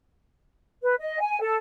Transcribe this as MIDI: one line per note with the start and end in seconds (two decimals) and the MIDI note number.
0.82 0.94 71
1.00 1.19 75
1.20 1.40 80
1.41 1.56 69